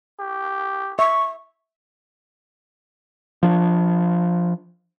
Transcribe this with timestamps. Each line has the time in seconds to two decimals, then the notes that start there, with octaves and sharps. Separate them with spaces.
0.20 G4
0.99 E5 C#6
3.43 F3 D4